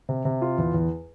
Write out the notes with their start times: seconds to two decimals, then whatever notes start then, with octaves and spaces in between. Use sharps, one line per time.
0.09 C3
0.25 C3
0.42 F4
0.58 E2
0.74 E2